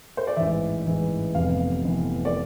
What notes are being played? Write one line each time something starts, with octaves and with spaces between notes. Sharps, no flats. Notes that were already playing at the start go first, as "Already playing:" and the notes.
C5
D5
A1 G#2 E3 E5
A1 G#2 E3
F1 F2 C3 E3 B3 F5
F1 F2 C3 E3 B3
D5